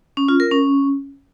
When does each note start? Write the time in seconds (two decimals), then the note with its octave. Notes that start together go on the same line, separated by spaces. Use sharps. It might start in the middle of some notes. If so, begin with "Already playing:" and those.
0.17 C#4
0.28 F4
0.40 A#4
0.51 C#4